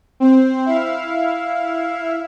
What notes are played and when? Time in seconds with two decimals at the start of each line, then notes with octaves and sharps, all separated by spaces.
0.20 C4 C5
0.66 E4 E5 F5